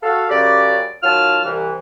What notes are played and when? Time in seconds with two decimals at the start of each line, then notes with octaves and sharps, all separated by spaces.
0.03 F#4 A4 F5
0.30 F#2 C#3 G4 D5
1.03 D#3 F#3 F4 A5 F6
1.44 C2 E3